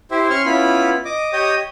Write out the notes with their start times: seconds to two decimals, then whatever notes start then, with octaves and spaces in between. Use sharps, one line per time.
0.11 E4 G4 C5 E5
0.30 C#4 C6 C#6 F6
0.46 B3 C#4 E4 F4 B5
1.05 D#5 D6
1.33 G4 C#5 D#5 G5 D#6